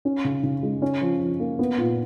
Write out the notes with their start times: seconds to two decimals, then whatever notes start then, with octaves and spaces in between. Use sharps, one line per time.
0.05 C#4
0.25 C#3
0.44 C#3
0.63 G#3
0.82 C#4
1.01 F3
1.21 F3
1.40 A#3
1.59 B3
1.78 A#2